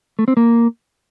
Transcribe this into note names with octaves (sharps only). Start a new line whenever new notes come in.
A3
C4
A#3